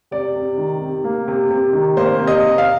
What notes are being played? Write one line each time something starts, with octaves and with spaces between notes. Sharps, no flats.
C3 D5
C3
D#3
C3
A#3
C3
C3
D#3
A#3 C5
C3
D#5
C3
F5